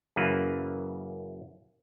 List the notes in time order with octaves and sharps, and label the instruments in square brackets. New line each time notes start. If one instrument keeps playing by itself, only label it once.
[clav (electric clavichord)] F#2 C#3 E3 A#3 B4